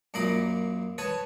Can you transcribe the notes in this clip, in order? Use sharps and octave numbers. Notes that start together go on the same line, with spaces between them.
F#2 A#2 A#3 D#5 B5 D6
B4 C#5 A5 D#6